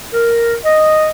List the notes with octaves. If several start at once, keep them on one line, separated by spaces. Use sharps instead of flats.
A#4
D#5